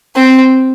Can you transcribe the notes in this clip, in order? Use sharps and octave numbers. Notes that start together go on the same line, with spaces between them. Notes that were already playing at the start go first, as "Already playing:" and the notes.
C4